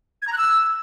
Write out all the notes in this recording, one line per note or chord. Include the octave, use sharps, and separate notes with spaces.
G#6
A#5
F#6
E6